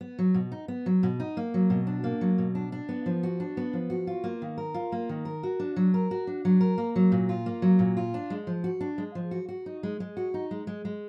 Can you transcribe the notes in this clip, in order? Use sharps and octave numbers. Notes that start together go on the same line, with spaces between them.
B3
F#3
B2
D#4
B3
F#3
B2
D#4
A#3
F#3
B2
D4
A#3
F#3
B2
D4
D4
B3
F3
F#4
D4
B3
F3
F#4
F4
A#3
D#3
A#4
F4
A#3
D#3
A#4
F#4
D4
F#3
A#4
F#4
D4
F#3
A#4
A#3
F#3
A#2
F4
A#3
F#3
A#2
F4
D4
G#3
F3
F#4
D4
G#3
F3
F#4
F#4
D#4
G#3
G#3
F#4
D#4
G#3
G#3
G#3